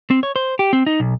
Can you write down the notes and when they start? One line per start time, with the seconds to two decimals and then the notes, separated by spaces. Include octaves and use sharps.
0.11 C4
0.23 C#5
0.36 C5
0.59 G4
0.73 C4
0.87 D#4
1.00 B1